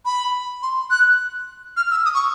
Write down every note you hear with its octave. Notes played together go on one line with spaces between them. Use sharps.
B5
C6
F#6
F6
E6
D#6
C#6